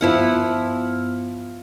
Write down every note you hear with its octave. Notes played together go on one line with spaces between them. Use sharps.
G2 F3 B3 E4 F#5 F6